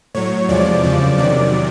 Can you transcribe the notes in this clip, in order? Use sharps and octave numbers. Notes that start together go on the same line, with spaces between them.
A2 F#3 C#5
E2 C3 F3 G#3 D5
F#2 C#3 F3
E2 C3 D#3 F#3 D5